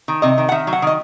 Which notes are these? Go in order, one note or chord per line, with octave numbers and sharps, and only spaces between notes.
D#3
C3 D#5
D#3
F#5
D#3 E5
F#3
F#5
D#3 D#5